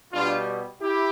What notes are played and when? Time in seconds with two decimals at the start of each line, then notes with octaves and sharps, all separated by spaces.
0.12 B2 G3 D4 F4
0.81 E4 G4